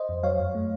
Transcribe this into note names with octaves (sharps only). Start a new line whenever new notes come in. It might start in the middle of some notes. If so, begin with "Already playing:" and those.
Already playing: C5 D#5
F2
F#3 C#5 F5
F#2
A3